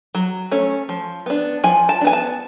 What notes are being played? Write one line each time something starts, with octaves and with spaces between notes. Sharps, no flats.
F#3
A3 C#4
F3
B3 D4
F3 G#5
A5
D4
B3 G#5
A5